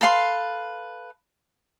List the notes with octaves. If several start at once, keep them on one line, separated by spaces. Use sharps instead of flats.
A4 B4 F5 C6